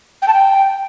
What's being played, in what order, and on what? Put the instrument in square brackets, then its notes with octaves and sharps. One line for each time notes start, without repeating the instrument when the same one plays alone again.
[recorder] G5
A5
G5